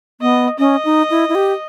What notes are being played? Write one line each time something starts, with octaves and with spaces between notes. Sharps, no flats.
B3 D#5
C#4 D#5
D#4
E4
E4
G4